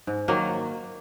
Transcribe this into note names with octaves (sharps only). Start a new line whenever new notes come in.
G#2
D#3 F#3 A#3